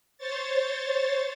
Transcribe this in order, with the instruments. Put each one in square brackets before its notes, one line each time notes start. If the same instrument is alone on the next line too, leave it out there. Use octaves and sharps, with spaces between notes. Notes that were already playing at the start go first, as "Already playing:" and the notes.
[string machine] C5 C#5 A6